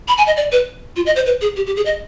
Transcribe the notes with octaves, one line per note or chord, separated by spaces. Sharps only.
B5
G#5
D#5
D5
B4
F4
D#5
C5
B4
G#4
G4
G4
G#4
D#5